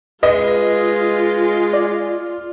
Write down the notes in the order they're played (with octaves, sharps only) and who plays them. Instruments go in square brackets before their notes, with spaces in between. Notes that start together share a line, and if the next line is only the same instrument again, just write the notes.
[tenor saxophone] G#3 [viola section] F4 [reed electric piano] B4 [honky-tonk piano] D#5
[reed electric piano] D5